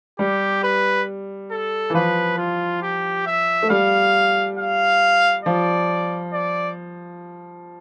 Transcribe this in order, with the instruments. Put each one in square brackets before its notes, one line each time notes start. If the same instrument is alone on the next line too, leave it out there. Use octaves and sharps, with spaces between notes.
[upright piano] G3 [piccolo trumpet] G4
[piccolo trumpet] B4
A4
[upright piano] E3
[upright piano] F3 [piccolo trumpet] B4
[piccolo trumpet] F4
G4
E5
[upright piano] A3
[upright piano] G3 [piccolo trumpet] F5
[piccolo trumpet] F5
[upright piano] F3 [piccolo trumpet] D5
[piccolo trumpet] D5